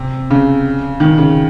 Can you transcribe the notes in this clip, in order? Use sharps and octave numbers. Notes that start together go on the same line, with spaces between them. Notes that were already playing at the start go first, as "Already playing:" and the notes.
Already playing: C3
C#3
D#3
C#3